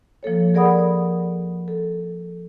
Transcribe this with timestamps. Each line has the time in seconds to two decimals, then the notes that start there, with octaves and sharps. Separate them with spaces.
0.23 F3 A#3 A4 C#5
0.54 G#4 A#4 D5 F#5 B5 D#6
1.68 A4